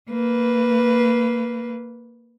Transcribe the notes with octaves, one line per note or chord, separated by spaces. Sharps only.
A#3 B4